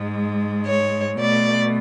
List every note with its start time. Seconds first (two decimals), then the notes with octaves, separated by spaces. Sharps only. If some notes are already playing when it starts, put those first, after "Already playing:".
Already playing: G#2 G#3
0.65 C#5
1.19 B2 A3 D5